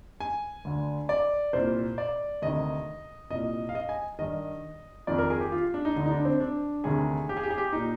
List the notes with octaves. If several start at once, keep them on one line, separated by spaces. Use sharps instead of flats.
G#5
D2 D3
D5
C2 A#2 C5
D5
D2 C3 D#3 D#5
C2 A#2 D#5
F5
D#5
G#5
G2 D#3 D#5
F2 D#3 D5
A#4
G#4
G4
F4
D4
D#4
D2 D3 D#4
D#4
D4
C4
D4
D2 C3 D#3 G#4
G4
G#4
G4
G#4
G4
A#2 D#4